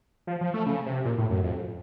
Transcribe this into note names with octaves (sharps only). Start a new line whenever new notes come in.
F3
F3
A3
C#3
C3
A#2
A2
F#2
F2